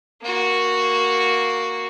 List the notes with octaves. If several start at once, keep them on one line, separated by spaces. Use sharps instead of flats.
A#3 F#4